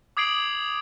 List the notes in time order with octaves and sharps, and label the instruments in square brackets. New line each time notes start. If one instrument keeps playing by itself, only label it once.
[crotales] D6 D#6 G#6 C7 D7 F#7